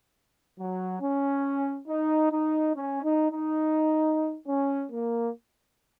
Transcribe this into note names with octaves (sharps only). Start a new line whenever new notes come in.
F#3
C#4
D#4
D#4
C#4
D#4
D#4
C#4
A#3